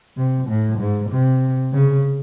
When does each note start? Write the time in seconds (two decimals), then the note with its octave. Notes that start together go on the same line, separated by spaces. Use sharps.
0.17 C3
0.48 A2
0.79 G#2
1.10 C3
1.73 C#3